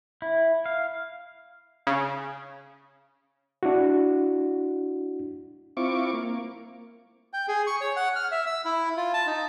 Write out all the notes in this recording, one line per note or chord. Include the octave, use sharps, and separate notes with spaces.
E4
F5
C#3
D4 E4 F#4
C4 E4 F4 C#6 D6
A#3
G5
G#4
C#6
C#5
F#5
F6
E5
E6
E4
F4
A5
D#4